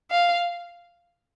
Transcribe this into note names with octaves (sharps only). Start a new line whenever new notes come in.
F5